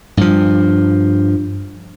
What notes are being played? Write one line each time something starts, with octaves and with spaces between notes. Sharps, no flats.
G2 F3